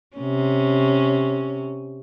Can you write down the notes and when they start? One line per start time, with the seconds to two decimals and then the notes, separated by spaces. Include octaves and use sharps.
0.16 C3 C#4